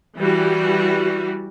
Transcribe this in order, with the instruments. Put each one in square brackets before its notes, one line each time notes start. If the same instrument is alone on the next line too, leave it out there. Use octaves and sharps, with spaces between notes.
[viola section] E3 G3 F#4